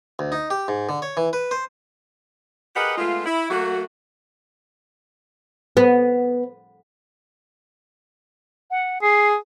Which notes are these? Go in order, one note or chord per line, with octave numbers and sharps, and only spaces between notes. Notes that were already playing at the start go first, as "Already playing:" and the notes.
D2
D#4
G4
G#2
D3
C#5
E3
B4
C5
G4 G#4 A#4 B4 D#5 F#5
G#3 A3 B3 F4
E4
F#3 A3 A#3 F#4
B3
F#5
G#4 C7